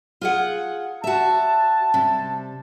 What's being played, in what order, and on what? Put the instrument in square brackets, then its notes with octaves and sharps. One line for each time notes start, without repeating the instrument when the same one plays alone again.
[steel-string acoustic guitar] F4 G#4 F#5
[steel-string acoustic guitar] F#4 E5 [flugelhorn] A5
[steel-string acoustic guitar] C3 G3